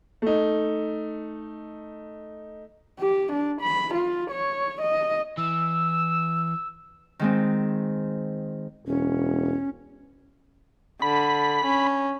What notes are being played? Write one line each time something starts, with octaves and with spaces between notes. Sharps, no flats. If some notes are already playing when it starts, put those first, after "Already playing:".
A3 D#4
G4
D4
B5
F4
C#5
D#5
E3 E6
D#3 G#3 C4
E1 C#4
D3 B5
C#4